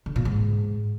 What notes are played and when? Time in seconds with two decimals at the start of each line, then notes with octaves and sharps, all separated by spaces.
0.06 D3
0.16 A#2
0.25 G#2